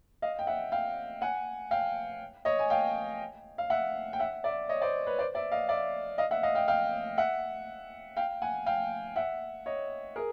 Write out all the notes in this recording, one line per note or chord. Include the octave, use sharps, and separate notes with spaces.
D#5 F5
G5
E5 F#5
F5 G5
F#5 G#5
F5 G5
C#5 D#5
G#5
F5 G5
F5
E5 F#5
G5
E5 F#5
D5 E5
C#5 D#5
C5 D5
B4 C#5
C5 D5
D5 E5
D#5 F5
D5 E5
D#5 F5
E5 F#5
D#5 F5
F5 G5
F5 G5
E5 F#5
F5 G5
F#5 G#5
F5 G5
E5 F#5
C#5 D#5
G#4 A#4